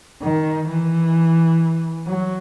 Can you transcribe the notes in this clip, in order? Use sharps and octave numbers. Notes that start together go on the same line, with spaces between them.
D#3
E3
F#3